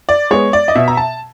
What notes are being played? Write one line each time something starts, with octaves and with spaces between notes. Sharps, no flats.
D5
G#3 B3 C#5
D5
D#5
B2 E5
A#5
A5